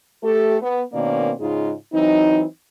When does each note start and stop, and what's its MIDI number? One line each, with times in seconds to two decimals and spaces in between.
0.23 0.57 57
0.23 0.57 67
0.23 0.57 69
0.61 0.82 59
0.93 1.32 47
0.93 1.32 51
0.93 1.32 58
0.93 1.32 60
0.93 1.32 61
0.93 1.32 74
1.39 1.72 44
1.39 1.72 49
1.39 1.72 56
1.39 1.72 63
1.39 1.72 65
1.39 1.72 68
1.93 2.43 52
1.93 2.43 54
1.93 2.43 60
1.93 2.43 63